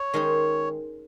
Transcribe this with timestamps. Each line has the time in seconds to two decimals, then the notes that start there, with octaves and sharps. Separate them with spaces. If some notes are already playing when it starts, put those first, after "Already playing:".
Already playing: C#5
0.14 D#3 G#3 C#4 G#4 C5